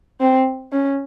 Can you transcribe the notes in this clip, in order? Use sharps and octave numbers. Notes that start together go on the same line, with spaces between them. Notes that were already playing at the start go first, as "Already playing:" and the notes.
C4
C#4